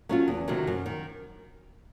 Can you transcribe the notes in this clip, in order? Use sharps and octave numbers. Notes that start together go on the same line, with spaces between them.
F#3 A3 C#4 F4
E2
C3 D#3 F#3 A3
F#2
D#3